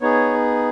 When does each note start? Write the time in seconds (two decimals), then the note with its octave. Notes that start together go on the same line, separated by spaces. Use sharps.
0.01 B3 D#4 G#4 C#5